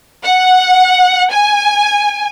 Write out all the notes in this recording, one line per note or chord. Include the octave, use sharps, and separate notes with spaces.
F#5
G#5